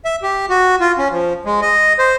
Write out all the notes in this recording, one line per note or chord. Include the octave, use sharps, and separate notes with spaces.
E5
G4
F#4
F4
C#4
F3
G#3
D#5
C5